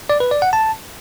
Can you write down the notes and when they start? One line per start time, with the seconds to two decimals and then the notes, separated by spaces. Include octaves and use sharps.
0.10 D5
0.20 B4
0.31 D5
0.42 F#5
0.53 A5